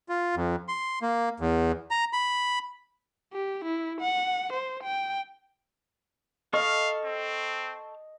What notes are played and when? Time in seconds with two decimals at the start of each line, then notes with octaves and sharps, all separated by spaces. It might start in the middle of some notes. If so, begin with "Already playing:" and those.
0.09 F4
0.36 F2
0.68 C6
1.02 A#3
1.40 E2
1.91 A#5
2.13 B5
3.33 G4
3.65 E4
4.01 F#5
4.53 C5
4.83 G5
6.53 A4 D#5 F5 C#6 F6
7.05 C4